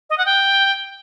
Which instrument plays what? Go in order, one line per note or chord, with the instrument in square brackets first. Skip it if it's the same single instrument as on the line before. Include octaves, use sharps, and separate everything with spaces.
[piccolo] D#5
F#5
G5